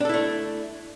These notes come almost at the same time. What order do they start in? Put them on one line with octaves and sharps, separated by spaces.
D4 A4 E4 A3